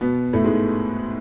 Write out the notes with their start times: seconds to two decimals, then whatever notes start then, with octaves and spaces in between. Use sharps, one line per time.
0.01 B2 B3
0.33 A2 A3
0.44 G#2 G#3